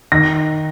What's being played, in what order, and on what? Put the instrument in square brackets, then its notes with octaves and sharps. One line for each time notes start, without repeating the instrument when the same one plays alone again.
[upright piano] D#3 A#6